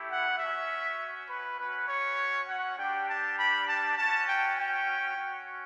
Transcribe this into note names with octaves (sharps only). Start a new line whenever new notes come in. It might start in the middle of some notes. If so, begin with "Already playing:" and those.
Already playing: A3 E4 G4
F#5
C#4 F#4 E5
B4
C#4 F#4 B4
C#5
F#5
G3 D4 G4 G5
A5
B5
A5
C#4 F#4 A5
G5
G5
C#4 F#4